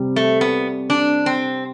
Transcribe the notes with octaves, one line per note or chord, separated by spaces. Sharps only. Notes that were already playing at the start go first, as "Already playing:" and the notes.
Already playing: C3 G3
A3
B3
D4
C4